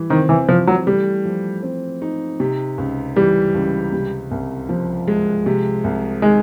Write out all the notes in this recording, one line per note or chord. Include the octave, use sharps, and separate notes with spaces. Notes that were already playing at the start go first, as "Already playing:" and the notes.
Already playing: E3 G3
D#3 C4
E3
E3 F3
F#3
G3 A3
F3
C4
D#4
C3
C#2
E3 G3
C#2
C3
C2
F3
G#3
C3
C2
D#3 G#3